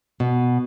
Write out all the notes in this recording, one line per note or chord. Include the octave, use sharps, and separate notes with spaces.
B2